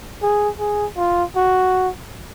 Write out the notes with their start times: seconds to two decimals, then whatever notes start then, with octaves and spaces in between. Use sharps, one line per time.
0.22 G#4
0.59 G#4
0.97 F4
1.36 F#4